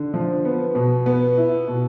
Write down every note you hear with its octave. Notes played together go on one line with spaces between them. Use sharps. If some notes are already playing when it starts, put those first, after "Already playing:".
Already playing: D3
F3
B3
B2
B3
E4
B2